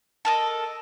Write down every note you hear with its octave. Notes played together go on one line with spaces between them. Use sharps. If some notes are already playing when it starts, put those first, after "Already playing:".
A4 A#4 D#5